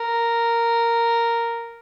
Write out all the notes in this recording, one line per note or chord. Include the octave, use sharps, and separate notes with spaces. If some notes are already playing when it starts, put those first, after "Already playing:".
Already playing: A#4